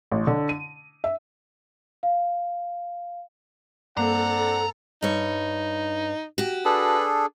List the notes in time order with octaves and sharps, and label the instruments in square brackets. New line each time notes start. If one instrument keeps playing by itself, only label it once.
[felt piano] A1
D3
D#7
E5
[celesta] F5
[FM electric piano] G2 A#3 [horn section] C4 D4 F#5 [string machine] A4 [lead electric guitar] A#5
[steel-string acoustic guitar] G2 C#5 [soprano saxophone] D#4
[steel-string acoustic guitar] F#4 G4
[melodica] D4 G#4 A4 [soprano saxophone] B4